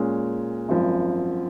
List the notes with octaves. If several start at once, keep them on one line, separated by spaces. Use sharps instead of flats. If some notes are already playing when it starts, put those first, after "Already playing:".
Already playing: A#2 G#3 C#4
G#1 F#2 F3